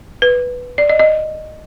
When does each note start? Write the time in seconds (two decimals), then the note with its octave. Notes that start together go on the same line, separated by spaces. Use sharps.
0.22 B4
0.78 D5
0.89 D#5
1.00 D#5